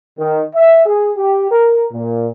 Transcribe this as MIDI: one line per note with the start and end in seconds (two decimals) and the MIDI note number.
0.19 0.43 51
0.55 0.85 76
0.86 1.12 68
1.17 1.49 67
1.51 1.86 70
1.93 2.28 46